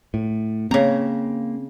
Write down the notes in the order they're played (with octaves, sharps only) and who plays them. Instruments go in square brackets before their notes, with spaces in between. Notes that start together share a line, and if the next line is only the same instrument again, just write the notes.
[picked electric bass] A2
[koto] C#3 A#5 [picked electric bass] A#3 C4